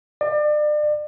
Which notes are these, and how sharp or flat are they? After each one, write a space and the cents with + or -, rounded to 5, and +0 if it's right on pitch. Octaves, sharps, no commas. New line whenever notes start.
D5 +35